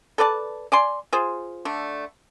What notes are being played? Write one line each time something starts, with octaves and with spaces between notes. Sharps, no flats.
A4 B4 D5 A5
D5 G#5 C6
F4 G#4 C5
D3 A3